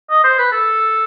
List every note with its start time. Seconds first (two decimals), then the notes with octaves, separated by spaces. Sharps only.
0.10 D#5
0.24 C5
0.39 B4
0.52 A4